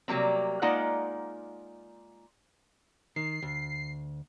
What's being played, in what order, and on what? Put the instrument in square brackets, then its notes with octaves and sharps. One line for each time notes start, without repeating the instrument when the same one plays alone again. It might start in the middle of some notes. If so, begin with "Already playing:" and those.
[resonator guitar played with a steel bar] C3 F#3 G3 A#3 C4
G#3 A#3 D#4 F4 D5 F#5
[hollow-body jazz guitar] D#3 [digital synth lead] C7
[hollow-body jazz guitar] D2